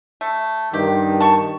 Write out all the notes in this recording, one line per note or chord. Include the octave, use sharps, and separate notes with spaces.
A3
G2 D#3 G4
A5 C#6